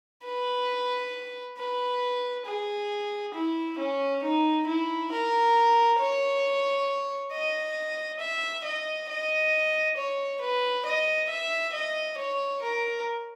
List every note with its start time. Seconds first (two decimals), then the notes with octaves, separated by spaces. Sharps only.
0.24 B4
1.57 B4
2.46 G#4
3.34 E4
3.78 C#4
4.23 D#4
4.67 E4
5.11 A#4
5.99 C#5
7.32 D#5
8.19 E5
8.64 D#5
9.09 D#5
9.97 C#5
10.41 B4
10.85 D#5
11.30 E5
11.73 D#5
12.18 C#5
12.62 A#4